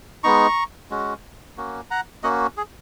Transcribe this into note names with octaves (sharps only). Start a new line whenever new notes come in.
G#3 B3 D#4 A#5 C#6
G#3 C#4 F#4
A#3 C#4 F#4
F#5 A#5
A#3 C#4 F#4 D#5 F#5
G#4